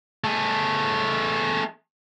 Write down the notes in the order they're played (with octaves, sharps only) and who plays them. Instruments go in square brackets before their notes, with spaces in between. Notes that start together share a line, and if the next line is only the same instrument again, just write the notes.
[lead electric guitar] A3 G#4